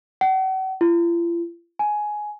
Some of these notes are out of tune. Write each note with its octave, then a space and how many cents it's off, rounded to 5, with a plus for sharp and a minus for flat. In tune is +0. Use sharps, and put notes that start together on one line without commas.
F#5 +40
F4 -45
G#5 +10